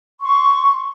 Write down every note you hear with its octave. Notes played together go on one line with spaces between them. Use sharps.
C6 C#6